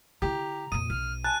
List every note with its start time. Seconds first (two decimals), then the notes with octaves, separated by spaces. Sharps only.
0.22 D3 E4 G4 A#5
0.72 F2 A#2 D#6 D#7
0.90 B1 F6
1.24 G#5 A5 F#6